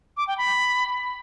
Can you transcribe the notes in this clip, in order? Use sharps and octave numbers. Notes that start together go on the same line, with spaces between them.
D6
G5
B5